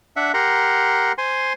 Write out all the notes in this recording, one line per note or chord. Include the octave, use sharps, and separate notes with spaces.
D4 E5 F#5
G4 A#4 F#5 A#5 C6
C5 G#5 C6